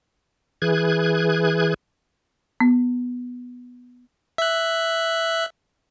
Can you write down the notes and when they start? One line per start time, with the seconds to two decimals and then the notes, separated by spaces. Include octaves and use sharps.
0.62 E3 G#4 F#6 G#6
2.61 B3
4.38 E5 F#6